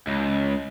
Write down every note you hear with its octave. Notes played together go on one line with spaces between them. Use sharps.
C#2